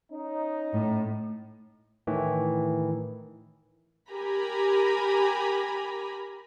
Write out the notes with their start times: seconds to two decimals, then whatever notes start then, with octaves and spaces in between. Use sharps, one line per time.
0.11 C#4 D#4
0.74 A2
2.07 A2 D#3 E3
4.12 G4 A#4 G#5 A#5 B5